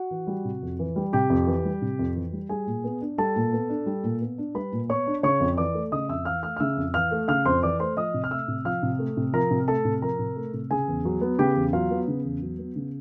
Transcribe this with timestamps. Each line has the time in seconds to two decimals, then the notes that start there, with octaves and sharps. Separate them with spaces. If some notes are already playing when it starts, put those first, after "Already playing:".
Already playing: F#4 F#5
0.11 E3
0.27 G3
0.45 C3
0.62 F2
0.79 E3
0.96 G3
1.13 C3 G4 G5
1.30 F2
1.47 E3
1.65 G3
1.82 C3
1.99 F2
2.16 E3
2.33 G3
2.49 G3 G#4 G#5
2.67 A#2
2.84 B3
3.01 D4
3.18 G3 A4 A5
3.36 A#2
3.53 B3
3.69 D4
3.86 G3
4.04 A#2
4.21 B3
4.38 D4
4.55 G3 B4 B5
4.72 A#2
4.89 B3 C#5 C#6
5.07 D4
5.23 C#3 C#5 C#6
5.40 F2
5.57 E3 D5 D6
5.74 A3
5.92 C#3 D#5 D#6
6.09 F2 E5 E6
6.25 E3 F5 F6
6.43 A3 F5 F6
6.56 F6
6.60 C#3 E5 E6
6.77 F2
6.94 E3 F5 F6
7.11 A3
7.28 C#3 F5 F6
7.46 F2 C5 C6
7.63 E3 D5 D6
7.79 A3 C5 C6
7.96 F3 D#5 D#6
8.14 C3
8.24 F6
8.31 A3 E5 E6
8.48 C3
8.65 F3 F5 F6
8.83 C3
8.99 A3
9.17 C3
9.33 F3 A#4 A#5
9.51 C3
9.68 A3 A4 A5
9.85 C3
10.02 F3 A#4 A#5
10.19 C3
10.36 A3
10.54 C3
10.71 C#3 G#4 G#5
10.88 E2
11.05 F#3
11.21 B3
11.39 C#3 G4 G5
11.56 E2
11.73 F#3 F4 F5
11.91 B3
12.08 C#3
12.24 E2
12.42 F#3
12.59 B3
12.76 C#3